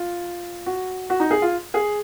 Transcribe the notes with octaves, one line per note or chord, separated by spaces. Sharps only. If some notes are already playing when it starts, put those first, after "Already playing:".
Already playing: F4
F#4
F#4
D#4
G#4
F4
G#4